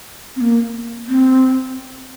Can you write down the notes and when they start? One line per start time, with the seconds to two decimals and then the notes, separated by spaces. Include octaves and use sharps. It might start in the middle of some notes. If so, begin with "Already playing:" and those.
0.36 C4
0.41 A#3
1.08 C4